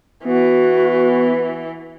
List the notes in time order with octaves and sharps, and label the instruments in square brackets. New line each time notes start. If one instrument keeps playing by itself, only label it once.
[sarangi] E3 [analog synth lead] B3 [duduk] F#4 [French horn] B4